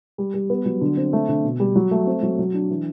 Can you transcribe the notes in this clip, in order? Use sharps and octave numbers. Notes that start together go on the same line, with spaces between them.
G3
G3
B3
F#3
D3
C4
A3
D3
B2
G3
F#3
A3
C4
F#3
F#3
D4
E3